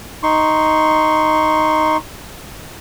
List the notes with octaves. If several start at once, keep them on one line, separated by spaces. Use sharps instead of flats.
D#4 C6 C#6